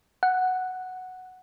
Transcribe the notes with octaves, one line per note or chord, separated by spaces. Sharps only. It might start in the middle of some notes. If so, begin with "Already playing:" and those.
F#5